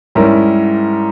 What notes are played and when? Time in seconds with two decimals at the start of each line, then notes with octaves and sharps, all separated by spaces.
0.15 G#2 G3 C#4 E4 A#4